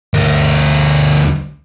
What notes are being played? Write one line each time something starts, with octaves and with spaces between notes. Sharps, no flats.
D2 A#4